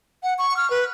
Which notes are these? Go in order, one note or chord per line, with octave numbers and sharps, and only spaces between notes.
F#5
C#6
F6
B4